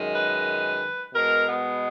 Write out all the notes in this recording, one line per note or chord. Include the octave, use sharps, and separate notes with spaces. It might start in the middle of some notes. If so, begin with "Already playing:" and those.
Already playing: F#2 D#3 G#3
B4
B2 G#3 A#4
B3